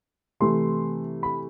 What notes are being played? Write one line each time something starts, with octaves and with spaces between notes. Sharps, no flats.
C3 E3 A3 C6
B5